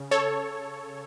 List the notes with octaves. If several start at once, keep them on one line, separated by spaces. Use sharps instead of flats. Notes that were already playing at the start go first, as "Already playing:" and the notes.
Already playing: C#3
A4 C#5